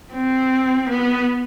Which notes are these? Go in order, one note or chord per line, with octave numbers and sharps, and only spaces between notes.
C4
B3